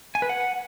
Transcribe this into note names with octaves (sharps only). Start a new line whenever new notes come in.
G#5
B4
F#5